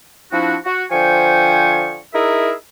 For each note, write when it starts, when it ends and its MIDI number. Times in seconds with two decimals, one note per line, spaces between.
0.32 0.56 53
0.32 0.56 60
0.32 0.56 62
0.32 0.56 64
0.32 0.56 66
0.65 0.84 66
0.91 1.99 50
0.91 1.99 53
0.91 1.99 72
0.91 1.99 79
0.91 1.99 80
0.91 1.99 85
2.14 2.53 63
2.14 2.53 64
2.14 2.53 68
2.14 2.53 70
2.14 2.53 76